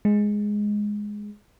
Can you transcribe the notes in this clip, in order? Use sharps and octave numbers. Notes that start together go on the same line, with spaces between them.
G#3